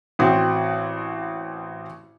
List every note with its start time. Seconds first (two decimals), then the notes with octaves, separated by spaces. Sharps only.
0.19 A1 C4 F#4